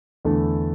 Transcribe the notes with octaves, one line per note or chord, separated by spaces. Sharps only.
E2 D3 A3 E4 A4